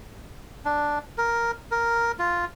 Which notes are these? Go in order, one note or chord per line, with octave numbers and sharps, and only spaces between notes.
D4
A#4
A#4
F4